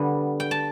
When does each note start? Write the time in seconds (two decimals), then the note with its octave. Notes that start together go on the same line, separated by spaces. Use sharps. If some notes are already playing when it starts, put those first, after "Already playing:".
Already playing: D3 G3 B3
0.40 G5
0.51 A5